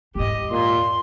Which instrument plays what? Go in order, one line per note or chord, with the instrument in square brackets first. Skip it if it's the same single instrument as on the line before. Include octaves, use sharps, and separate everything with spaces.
[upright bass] E2 G#2 [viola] G4 D#5
[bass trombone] A#2 [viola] C6